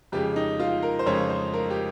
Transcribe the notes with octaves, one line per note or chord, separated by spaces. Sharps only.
F2 C#3 G#3 G4
D#4
F4
A#4
C5
F2 C#3 G#3 C#5
C5
A#4
G4